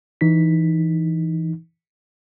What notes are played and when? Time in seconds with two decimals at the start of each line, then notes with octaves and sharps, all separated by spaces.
0.21 E3 D#4 B6